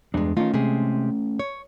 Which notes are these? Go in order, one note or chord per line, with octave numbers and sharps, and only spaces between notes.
E2 G2 G#3 D4
D#3 A3 C#4 D#4 F4
C3 G#3 G#4
C#5